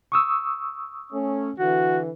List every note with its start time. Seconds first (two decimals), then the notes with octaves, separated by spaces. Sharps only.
0.12 C#6 D#6 E6
1.12 A3 C#4
1.59 D3 E3 F#4